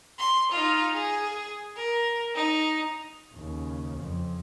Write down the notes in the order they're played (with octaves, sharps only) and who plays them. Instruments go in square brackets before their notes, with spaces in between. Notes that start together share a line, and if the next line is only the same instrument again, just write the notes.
[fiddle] C6
D#4 F4
G#4
A#4
D#4
[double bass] D#2 C#3
F2